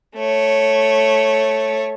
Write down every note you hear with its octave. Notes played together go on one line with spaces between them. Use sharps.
A3 C#5